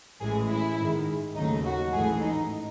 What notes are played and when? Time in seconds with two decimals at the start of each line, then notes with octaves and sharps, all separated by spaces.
0.21 A1 A2 E3 G#3 G#4
0.50 E4
0.79 G#2 D#3 G#3
1.35 D#2 C#3 F#3 A3 D#4
1.65 F#4
1.93 A1 G#2 E3 A3 G#4
2.22 D#4